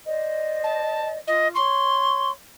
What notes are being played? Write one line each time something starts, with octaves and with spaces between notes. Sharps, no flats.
C5 D5 D#5
A5
F4 D#5
C#5 C6 C#6